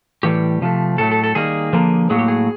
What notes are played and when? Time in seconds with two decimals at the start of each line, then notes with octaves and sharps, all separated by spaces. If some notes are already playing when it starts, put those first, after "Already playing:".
0.23 A2 E3 G3 G4
0.61 C3 F3 A3
0.98 A2 F#3 A3 A4
1.12 A4
1.24 A4
1.35 D#3 G3 A#3 G#4
1.73 D3 F3 A#3
2.10 A2 F#3 A#3 G#4
2.19 G4
2.28 G#4